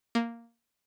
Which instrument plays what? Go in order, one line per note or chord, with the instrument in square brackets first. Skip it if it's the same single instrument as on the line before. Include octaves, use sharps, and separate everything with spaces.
[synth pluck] A#3